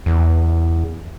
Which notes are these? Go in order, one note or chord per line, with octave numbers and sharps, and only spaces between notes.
E2